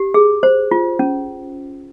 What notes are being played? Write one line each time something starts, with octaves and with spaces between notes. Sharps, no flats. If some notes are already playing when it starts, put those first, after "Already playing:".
Already playing: G4
G#4
C5
F4
C#4